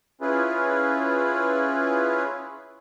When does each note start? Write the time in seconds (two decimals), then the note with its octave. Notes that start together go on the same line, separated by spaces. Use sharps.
0.21 C#4 E4 F4 G#4 B4